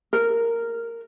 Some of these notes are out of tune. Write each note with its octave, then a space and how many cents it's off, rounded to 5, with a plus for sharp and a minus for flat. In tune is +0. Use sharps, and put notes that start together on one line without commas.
A#4 -10